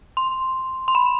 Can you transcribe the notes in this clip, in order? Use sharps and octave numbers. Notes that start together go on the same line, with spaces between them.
C6
C6
B5